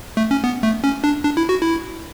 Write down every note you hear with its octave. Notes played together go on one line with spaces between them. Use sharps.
A3
C#4
B3
A3
C#4
D4
D4
E4
F#4
E4